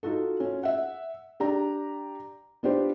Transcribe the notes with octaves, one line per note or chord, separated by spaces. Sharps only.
D#4 F4 F#4 A4
C#4 F4
E5 F#5
D4 G4 A#5
B3 D4 F4 G4 C5